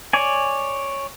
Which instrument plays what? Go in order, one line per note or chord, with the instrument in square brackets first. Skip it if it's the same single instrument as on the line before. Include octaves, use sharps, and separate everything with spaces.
[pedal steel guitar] C#5 D5 G#5